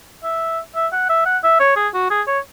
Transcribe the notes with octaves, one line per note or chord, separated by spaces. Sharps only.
E5
E5
F#5
E5
F#5
E5
C#5
G#4
F#4
G#4
C#5